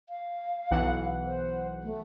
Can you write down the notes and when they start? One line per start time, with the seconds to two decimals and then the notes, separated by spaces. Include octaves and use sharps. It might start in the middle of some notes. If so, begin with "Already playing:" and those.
0.09 F5
0.71 B1 E3 F#5
1.25 C5
1.83 A3